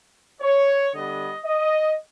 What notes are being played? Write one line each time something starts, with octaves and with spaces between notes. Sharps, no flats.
C#5
D3 G3 B3 D#5
D#5